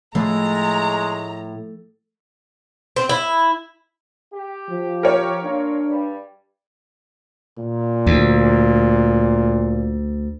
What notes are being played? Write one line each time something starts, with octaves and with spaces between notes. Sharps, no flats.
A2 F3 G#3 A3 A#5
C4
E4
G4
F3
A#4 C#5
A#2 A#3 D4
G2 G3
A#2
D2